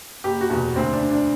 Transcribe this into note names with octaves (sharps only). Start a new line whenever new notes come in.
F#1 G4
F#4
E2 B2
D2 C4
D4
D3
D4